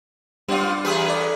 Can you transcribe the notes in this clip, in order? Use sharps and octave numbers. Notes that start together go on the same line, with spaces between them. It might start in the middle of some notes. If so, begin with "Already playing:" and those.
G3 B3 D4 F4 D5
E2 G4 G#4 B4
A4 D5